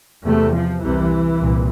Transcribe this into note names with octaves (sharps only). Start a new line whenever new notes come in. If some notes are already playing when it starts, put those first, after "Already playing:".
E2 C3 A3
F3
C2 C3 E3
C2 A#2